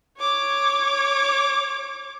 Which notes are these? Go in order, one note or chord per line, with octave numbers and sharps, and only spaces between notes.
C#5 D6